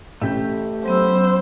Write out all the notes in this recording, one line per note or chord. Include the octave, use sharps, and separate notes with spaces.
A1 A3 G4 G6
F#3 B3 C5 E6